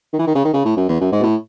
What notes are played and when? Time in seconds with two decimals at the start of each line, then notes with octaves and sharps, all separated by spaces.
0.13 D#3
0.19 E3
0.27 D#3
0.35 C#3
0.44 D#3
0.54 C#3
0.65 A2
0.77 F#2
0.89 E2
1.01 F#2
1.12 G#2
1.20 B2
1.23 A2